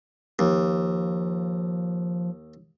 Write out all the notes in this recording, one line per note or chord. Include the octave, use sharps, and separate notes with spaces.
D#2 F3